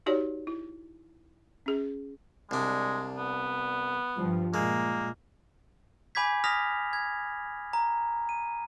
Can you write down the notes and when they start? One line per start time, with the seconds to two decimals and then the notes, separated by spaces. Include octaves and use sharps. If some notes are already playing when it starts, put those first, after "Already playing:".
0.06 D#4 F#4 G4 C#5 D5
0.47 E4
1.66 C#4 G#4
2.51 C2 G#3 D4
3.17 B3
4.17 G2 F3
4.54 A#2 G#3 A#3
6.15 G#5 B5 D6 G6 G#6 B6
6.44 D#6 F6 A#6 B6 F7
6.93 G#6
7.73 A#5
8.29 D#7